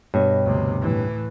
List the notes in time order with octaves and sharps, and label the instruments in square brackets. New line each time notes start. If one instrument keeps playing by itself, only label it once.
[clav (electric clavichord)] G2 [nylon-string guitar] B2 C#5 D#5
[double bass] D2 C3
A2 E3